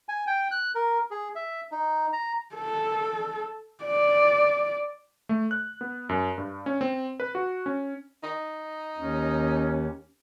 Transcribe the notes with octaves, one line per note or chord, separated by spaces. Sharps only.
G#5
G5
F#6
A#4
G#4
E5
D#4
A#5
A4
D5
A3
F#6
B3
F#2
G2
C#4
C4
B4
F#4
C#4
D#4
D#2 C#4